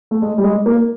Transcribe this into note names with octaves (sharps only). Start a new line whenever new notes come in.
A3
G#3
G3
G#3
A#3